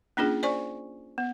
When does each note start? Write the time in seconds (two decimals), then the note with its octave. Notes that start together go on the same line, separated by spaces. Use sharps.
0.17 A#3 C#4 D4 F4 G#4
0.43 C5 D5 G#5 C#6
1.18 B3